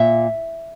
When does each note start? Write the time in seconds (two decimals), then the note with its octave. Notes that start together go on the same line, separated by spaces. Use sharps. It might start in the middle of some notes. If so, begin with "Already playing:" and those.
Already playing: A#2 E5